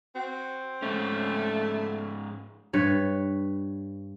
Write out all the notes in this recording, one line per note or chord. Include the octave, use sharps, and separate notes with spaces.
C4 F#4
G#2 A3 C#4
G2 B4 C#5